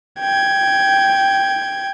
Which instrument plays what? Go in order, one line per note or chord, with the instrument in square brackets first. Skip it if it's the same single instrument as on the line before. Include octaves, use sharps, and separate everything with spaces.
[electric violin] G5 G#6